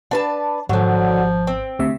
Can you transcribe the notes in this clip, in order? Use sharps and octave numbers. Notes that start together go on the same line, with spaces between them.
D4 B4 A5
G#1 D3 F3 F#3
C4
D2 C3 E5